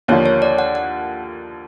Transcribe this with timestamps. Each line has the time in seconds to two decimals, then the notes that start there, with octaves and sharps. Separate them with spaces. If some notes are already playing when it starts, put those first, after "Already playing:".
0.08 D#2 D3 F3 A#3 C#5
0.26 C#5
0.42 D5
0.59 F#5
0.75 F#5